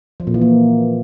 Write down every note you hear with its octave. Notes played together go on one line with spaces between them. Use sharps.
F3
A#2
E3
A#3